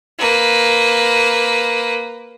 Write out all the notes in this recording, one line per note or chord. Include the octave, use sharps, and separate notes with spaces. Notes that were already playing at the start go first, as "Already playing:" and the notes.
A#3 B4